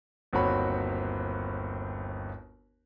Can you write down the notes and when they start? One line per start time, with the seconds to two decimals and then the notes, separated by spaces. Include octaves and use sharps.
0.33 G1 D#2 C4 F#4 C#5 B5